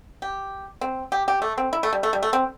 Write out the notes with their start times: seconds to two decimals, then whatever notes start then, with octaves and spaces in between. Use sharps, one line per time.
0.22 G4
0.81 C4
1.12 G4
1.28 G4
1.42 A3
1.58 C4
1.73 E4
1.83 A3
1.93 G3
2.03 A3
2.13 G3
2.23 A3
2.33 C4